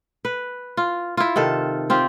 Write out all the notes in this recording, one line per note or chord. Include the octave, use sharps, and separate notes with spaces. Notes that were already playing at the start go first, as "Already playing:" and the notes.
B4
F4
E4 F4
C3 D#3 A4
C4 F4 G4